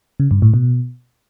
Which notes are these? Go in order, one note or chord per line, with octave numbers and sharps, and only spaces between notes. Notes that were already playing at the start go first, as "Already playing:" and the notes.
C#3
G2
A2
B2